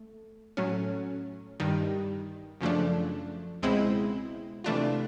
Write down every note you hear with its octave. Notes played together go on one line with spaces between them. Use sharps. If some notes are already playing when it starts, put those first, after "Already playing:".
Already playing: A3
A2 F#3 A3 C#4
G2 D#3 G3
F#2 C#3 F3 A3 D4
C#2 B2 G#3 C4 E4
C3 E3 A3 D4 F4